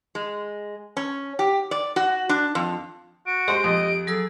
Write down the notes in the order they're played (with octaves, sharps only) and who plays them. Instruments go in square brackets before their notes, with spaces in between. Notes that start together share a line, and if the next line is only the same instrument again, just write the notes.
[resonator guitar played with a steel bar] G#3
C#4
G4
D5
F#4
D4
F2
[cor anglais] F#4 [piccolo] D7
[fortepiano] G#3 C5 [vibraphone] G4
[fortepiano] F2 [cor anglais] D#5
[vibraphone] F#3 A4 E6 [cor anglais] G#4